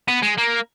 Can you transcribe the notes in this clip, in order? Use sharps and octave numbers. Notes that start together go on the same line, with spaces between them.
B3
G#3
A#3